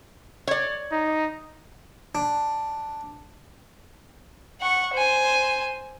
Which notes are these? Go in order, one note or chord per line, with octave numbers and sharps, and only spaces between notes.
C#5 D5
D#4
D4
F#5 C#6
C5 G#5